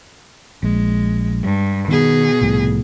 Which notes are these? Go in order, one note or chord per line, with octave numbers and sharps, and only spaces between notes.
A#1 G#3
G2
B2 D#3 G#4
C2 A2 F3